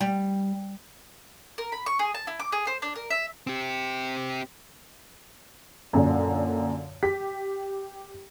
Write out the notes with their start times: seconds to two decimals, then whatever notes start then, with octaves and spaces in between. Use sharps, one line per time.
0.01 G3
1.58 A#4
1.72 B5
1.86 C#6
1.99 G#4
2.14 A5
2.27 E4
2.39 D6
2.52 G#4
2.67 C5
2.82 D4
2.96 A#4
3.10 E5
3.47 C4 G4
5.93 F#2 A#2 D3
7.03 G4 B6